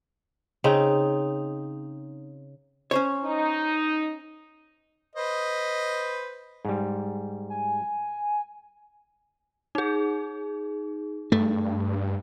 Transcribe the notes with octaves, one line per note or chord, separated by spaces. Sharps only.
C#3 C4 D#4
C#4 C5 C#5
D#4
B4 C5 D#5
G#2 G3
G#5
D#4 G#4
G2 A3